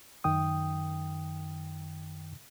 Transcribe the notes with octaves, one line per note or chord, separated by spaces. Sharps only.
F#2 D#3 G5 D#6